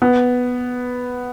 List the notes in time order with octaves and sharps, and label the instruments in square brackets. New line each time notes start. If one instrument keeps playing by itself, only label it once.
[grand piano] B3